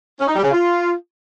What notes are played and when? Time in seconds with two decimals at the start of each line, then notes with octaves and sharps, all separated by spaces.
0.19 C#4
0.27 D#4
0.35 G3
0.43 C#3
0.51 F4